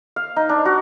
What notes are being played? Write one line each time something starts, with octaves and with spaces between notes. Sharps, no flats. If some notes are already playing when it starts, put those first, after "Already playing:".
F5
D#4
D4
F#4